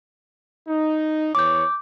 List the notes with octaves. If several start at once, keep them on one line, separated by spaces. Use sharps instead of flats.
D#4
E2 C#5 D6 G6